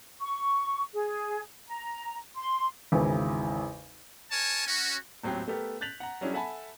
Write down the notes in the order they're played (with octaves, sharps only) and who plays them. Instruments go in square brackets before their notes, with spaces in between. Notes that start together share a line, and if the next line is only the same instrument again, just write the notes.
[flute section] C#6
G#4
A#5
C6
[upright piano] G#1 E2 C#3 E3
[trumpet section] A#4 C#5 G#5 A5
C#4 F#4
[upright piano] D#1 A2 F#3 C4 G4
A3 B3 G4 A4 A#4
F#6 G6 A6 B6 F7 F#7
F#5 A#5
F#3 G3 C#4 D4 E4 G#4
A4 E5 F#5 G#5 A5 B5